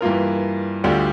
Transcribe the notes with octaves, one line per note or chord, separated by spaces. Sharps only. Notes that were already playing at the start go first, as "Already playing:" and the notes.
G2 E3 A#3 F4 A#4
D2 D3 G3 D4 F4